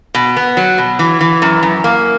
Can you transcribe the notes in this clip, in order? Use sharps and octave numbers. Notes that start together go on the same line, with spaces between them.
B2
B3
F#3
B2
E3
E3
F#2
F#2
A#3